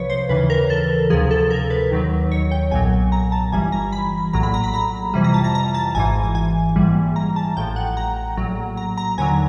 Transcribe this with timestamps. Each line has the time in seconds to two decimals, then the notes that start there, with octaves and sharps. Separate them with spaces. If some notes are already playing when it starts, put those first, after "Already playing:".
Already playing: C2 C3 F3 B4 C#5
0.10 C5
0.29 D#2 C#3 E3 B4
0.50 A#4
0.70 A4
1.10 D2 C3 F3 G#4
1.31 A4
1.51 A#4
1.70 B4
1.91 D#2 D#3 F#3
2.32 C#5
2.51 G5
2.71 B1 A#2 F#3 G#5
3.12 A#5
3.32 A5
3.52 G1 G2 E3 G3 G#5
3.72 A#5
3.92 B5
4.33 A#1 A2 F#3 A#5
4.43 B5
4.54 A#5
4.64 B5
4.74 A#5
5.14 F2 C3 E3 G3
5.24 A#5
5.34 A5
5.44 A#5
5.55 A#5
5.74 A5
5.95 G#1 G#2 E3 G#5
6.35 G#5
6.76 A#1 G#2 E3 G3
7.16 A#5
7.36 A5
7.57 A1 A2 F3 G5
7.76 F#5
7.97 A#5
8.37 A#1 A2 F#3
8.77 A#5
8.98 A#5
9.18 D#2 D3 F#3 G#5